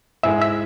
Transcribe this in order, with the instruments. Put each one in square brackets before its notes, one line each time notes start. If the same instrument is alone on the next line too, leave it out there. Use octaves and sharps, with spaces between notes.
[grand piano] G#2 G#3 E4 G#4 [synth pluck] E5
[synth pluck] E5